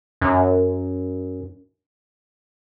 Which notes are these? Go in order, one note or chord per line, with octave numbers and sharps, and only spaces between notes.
F#2